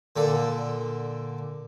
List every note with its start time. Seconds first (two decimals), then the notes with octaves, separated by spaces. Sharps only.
0.16 A#2 D3 A4